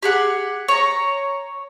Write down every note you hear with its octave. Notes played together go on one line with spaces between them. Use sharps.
G4 G#4 F#5
C#5 A#5